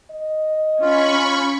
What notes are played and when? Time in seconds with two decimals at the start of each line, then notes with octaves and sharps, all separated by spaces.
0.11 D#5
0.82 C#4 F4 B5 C#6